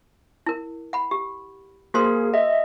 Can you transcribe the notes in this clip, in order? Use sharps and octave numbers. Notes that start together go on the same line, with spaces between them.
E4 A#4
F#5 B5
G4
A#3 F#4 G#4 A#4 C5 C6
D#5 E5